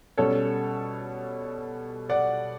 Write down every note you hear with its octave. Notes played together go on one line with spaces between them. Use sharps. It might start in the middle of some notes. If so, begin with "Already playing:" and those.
B2 G3 C#4 A4 C#5
D5 F#5